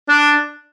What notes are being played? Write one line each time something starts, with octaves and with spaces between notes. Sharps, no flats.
D4